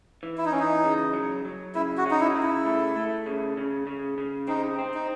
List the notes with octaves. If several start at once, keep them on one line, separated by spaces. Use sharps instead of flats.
E3
E4
D#4
E3 C#4
D#4
C#3
F#3
F#3
C#3 E4
F#4
C#4
D#4
E4
C#3
E4
A3
A3
C#3
C#3
C#3
C#3
C4 D#4
C4
D#4